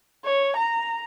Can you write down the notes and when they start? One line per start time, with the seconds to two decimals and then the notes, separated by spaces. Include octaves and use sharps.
0.25 C#5
0.57 A#5